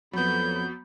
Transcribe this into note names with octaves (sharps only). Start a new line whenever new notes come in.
F2 F#3 B3 B5 G6